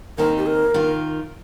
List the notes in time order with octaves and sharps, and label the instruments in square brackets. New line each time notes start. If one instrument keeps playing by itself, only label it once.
[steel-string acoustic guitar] D#2 D#3 C4 D#4 [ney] A#4
[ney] G4
A#4
[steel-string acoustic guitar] D#3 A#3 F4